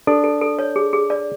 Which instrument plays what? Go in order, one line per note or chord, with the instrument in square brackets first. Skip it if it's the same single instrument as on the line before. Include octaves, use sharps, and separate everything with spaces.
[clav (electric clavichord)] D4 [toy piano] A4
[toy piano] A4
A4
C#5
G#4
G#4
D5